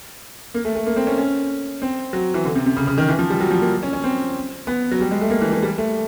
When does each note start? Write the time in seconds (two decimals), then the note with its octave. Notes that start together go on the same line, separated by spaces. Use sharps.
0.54 A#3
0.65 A3
0.75 A3
0.87 A#3
0.96 C4
1.07 C#4
1.18 C#4
1.82 C4
2.13 F#3
2.34 E3
2.45 D3
2.55 C3
2.66 C3
2.76 C#3
2.87 C#3
2.98 D#3
3.09 E3
3.19 F3
3.30 G3
3.40 F#3
3.50 F3
3.61 A#3
3.83 C#4
3.93 C#4
4.04 C4
4.67 B3
4.91 F#3
5.01 G3
5.11 G#3
5.21 A3
5.30 A#3
5.41 E3
5.52 E3
5.63 G3
5.78 A3